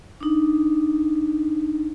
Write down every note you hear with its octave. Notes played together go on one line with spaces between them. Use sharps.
D4 D#4